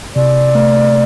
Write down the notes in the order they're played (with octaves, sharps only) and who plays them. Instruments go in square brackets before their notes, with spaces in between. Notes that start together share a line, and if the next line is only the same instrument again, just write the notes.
[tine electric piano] C3 [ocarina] D5
[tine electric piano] A3